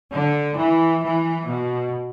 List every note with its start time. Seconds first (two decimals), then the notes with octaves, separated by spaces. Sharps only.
0.13 D3
0.59 E3
1.05 E3
1.50 B2